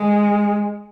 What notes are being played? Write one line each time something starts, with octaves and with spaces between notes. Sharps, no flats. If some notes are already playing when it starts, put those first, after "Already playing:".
Already playing: G#3